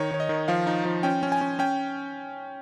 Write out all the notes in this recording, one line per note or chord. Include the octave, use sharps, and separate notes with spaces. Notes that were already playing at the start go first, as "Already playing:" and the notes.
Already playing: D#3 D#4 C#5
D#3 C#5
D#5
D#3
F3 F5
D#4
F3
C#4 G5
C#4
G#5
C#4
C#4 G5